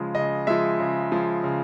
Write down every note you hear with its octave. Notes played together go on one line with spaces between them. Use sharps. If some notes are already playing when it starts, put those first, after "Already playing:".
Already playing: C#3 F3 G#3
C#3 D#5
F3 G#3 E5
C#3
F3 G#3
C#3